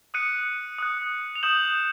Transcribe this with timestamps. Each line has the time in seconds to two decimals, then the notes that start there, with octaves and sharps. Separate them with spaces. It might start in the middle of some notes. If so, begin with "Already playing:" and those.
0.14 D#6 F#6 C#7 D#7
0.79 D#6 F#6
1.36 F7
1.43 D#6 G6 E7 F#7